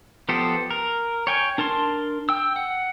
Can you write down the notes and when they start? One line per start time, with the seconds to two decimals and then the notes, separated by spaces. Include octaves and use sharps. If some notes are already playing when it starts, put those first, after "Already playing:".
0.29 F3 B3 G4 A4 C5
0.71 A#4
1.27 C#5 G5 G#5
1.58 D4 A#4 A5 C6
2.29 G5 E6
2.56 F#5